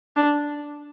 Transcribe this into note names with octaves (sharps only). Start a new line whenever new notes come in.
D4